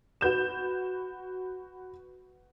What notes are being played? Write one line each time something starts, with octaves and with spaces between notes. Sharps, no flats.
F#4 B4 G6 E7